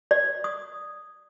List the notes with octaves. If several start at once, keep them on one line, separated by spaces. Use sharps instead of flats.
D5
D#6